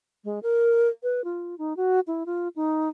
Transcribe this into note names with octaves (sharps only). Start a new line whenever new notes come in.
G#3
A#4
B4
F4
D#4
F#4
E4
F4
D#4